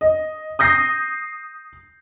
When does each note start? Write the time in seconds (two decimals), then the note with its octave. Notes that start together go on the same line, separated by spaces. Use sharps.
0.01 D#5
0.59 D#6 G6 A#6 C7